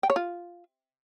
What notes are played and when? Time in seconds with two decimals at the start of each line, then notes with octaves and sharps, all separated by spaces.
0.03 G5
0.10 C#5
0.16 F4